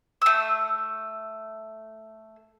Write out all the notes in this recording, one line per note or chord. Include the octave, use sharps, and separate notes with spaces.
A3 E6